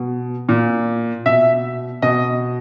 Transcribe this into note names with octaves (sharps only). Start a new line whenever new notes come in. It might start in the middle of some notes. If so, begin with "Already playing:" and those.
Already playing: B2
A#2
B2 E5
B2 D#5